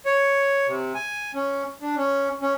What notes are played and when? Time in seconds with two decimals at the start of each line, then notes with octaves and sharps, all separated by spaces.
0.06 C#5
0.68 C3
0.95 G#5
1.35 C#4
1.82 D4
1.97 C#4
2.42 C#4